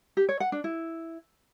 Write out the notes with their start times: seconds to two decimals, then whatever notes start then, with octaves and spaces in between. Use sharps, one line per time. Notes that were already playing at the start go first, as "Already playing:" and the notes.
0.17 G4
0.29 C#5
0.40 F#5
0.52 D4
0.64 E4